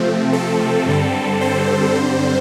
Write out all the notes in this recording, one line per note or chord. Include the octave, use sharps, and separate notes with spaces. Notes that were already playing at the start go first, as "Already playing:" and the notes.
Already playing: C3 F3 A3 C4
A4
G2 D3 G3 C4
C5
G2 D3 G3 C4